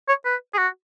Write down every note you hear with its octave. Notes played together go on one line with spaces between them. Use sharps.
C#5
B4
G#4
F#4